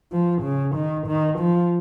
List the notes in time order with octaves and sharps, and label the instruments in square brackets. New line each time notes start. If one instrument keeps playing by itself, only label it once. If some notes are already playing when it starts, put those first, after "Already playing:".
[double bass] F3
C#3
D#3
D#3
F3